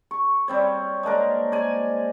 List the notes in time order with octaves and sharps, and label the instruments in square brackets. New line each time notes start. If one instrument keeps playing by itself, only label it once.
[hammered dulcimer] C#6
G3 C4 C#5
G#3 A#3 D4 A#4
D5 G#5